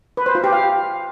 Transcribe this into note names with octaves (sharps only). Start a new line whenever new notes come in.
B4
C5
F4
G4
F5